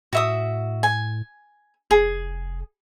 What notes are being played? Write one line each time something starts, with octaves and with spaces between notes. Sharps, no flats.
A2 F#4 E5 D#6
G#5
F1 G#4